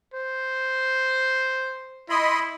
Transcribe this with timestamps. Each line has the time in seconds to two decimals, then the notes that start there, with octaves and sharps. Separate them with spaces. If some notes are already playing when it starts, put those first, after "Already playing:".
0.14 C5
2.09 E4 D#5 B5 C6